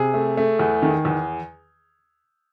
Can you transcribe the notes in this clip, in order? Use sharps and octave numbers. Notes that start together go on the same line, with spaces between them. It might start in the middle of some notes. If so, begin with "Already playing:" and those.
Already playing: C3 G#4
A3
A3
E2
D#3
E2